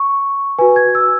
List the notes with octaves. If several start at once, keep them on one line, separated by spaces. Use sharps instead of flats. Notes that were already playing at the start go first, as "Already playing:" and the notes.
Already playing: C#6
F#4 B4 G#5
G#6
E6